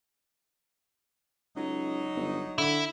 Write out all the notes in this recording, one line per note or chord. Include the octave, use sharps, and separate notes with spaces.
C#2 F#3 D#4
G1
D3 E4